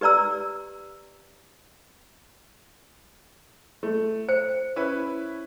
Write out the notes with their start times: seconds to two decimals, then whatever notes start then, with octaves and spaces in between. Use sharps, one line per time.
0.01 G4 B4 D5 A#5 E6
3.83 A3
4.29 C5 C#7
4.76 C#4 E4 B4